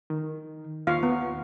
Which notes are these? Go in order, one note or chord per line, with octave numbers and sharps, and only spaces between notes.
D#3
D#2 F4 F5 C#6
B3